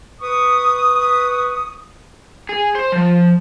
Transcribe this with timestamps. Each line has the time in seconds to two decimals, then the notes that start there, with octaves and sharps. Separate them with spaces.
0.21 B4 C#6 D#6
2.49 G#4
2.75 C5
2.92 F3